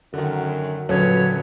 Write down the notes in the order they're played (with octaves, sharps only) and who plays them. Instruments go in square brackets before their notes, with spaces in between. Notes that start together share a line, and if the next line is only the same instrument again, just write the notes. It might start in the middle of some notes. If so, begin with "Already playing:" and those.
[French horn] F#2 [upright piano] D3 D#3
[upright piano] D#1 D3 C#4 [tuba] F#3 [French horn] B4 [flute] C#5